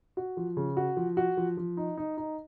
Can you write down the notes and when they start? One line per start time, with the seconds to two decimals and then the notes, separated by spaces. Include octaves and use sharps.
0.17 F#4
0.37 F3
0.57 C#3
0.77 F#4
0.97 F3
1.17 F#4
1.37 F3
1.57 F3
1.77 D#4
1.97 D#4
2.17 D#4